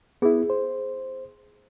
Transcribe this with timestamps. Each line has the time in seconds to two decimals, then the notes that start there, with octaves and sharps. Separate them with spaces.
0.22 B3 E4 G#4
0.50 C5